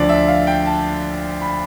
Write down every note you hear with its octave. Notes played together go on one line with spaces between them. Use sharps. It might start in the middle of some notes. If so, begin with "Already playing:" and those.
Already playing: D2 D3 F3 D5
E5
F5
G5
A5
B5